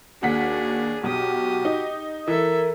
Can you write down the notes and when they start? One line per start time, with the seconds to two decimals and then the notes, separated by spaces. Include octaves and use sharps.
0.23 D#2 D4 F#4 G#4 F#5 B6
1.03 B1 F#4 G4 D#6
1.65 D#4
2.28 E3 A4 A#4 E5